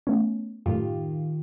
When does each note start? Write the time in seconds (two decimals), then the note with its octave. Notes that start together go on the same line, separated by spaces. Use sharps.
0.07 A3 B3 C#4
0.66 F#2 A2 D#3 F4 G4